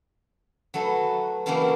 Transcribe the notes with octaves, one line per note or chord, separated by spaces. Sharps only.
F#3 A3 A4 B4
C#3 E3 F#3 A3 A#3 C4